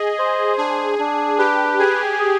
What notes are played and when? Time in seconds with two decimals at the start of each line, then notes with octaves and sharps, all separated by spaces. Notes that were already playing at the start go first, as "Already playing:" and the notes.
Already playing: G#4 D#5
0.19 C5
0.58 D4 G#4
0.99 D4
1.39 G4 B4
1.79 G#4 G#5
2.19 G#4